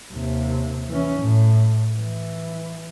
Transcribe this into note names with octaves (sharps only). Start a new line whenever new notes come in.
D#2 C3
E3 C#4
A2
E3